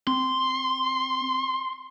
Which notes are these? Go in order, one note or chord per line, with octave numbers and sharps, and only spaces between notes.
C4 C6